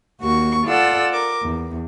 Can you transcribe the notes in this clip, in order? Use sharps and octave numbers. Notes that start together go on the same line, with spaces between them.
D#2 A#3 F#4 C#6
F4 A4 D5 F#5 E6
A#4 D6
E2